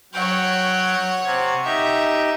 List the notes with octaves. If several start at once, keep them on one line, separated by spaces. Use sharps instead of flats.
F#3 C#5 F#5 G5
C3 G#6
D#4 G4 E5